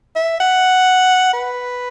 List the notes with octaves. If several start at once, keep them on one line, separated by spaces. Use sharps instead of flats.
E5
F#5
B4